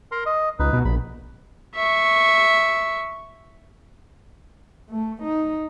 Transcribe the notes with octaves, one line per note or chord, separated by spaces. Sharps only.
A#4 A#5 C6
D#5
C#2 D#4 B4
B2
A#1 B5
E5 C#6
A3
D#4